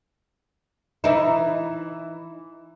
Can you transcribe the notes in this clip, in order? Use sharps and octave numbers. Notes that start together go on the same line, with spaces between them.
E3 D#4 E4